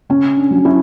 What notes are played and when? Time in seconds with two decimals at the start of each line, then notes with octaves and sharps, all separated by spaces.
0.09 C#3 C#4
0.37 D4
0.51 F#3
0.65 C#4 E4